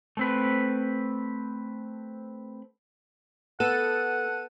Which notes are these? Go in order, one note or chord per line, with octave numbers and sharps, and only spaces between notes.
A3 C4 B4
B3 A4 F#5 D#7